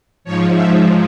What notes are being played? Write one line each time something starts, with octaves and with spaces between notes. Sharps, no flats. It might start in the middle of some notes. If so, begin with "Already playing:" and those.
G#2 F3 C#5
E5